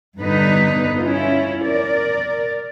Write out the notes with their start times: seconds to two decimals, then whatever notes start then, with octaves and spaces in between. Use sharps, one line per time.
0.18 G2 D3 B3 D#4 B4
1.03 C#4 E4 F4
1.64 A#4 D5